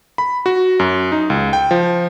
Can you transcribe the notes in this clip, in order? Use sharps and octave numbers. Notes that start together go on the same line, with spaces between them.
B5
F#4
F#2
D#4
C#2
G5
F3